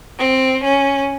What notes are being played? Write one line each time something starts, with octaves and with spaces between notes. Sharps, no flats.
C4
C#4